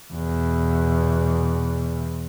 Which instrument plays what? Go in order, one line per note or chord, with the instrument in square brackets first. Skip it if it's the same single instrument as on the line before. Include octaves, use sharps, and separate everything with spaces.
[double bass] E2 B2